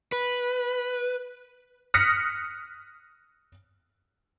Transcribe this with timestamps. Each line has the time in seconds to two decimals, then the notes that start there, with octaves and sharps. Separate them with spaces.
0.12 B4
1.94 D#6 F6 F#6 A#6 B6 C#7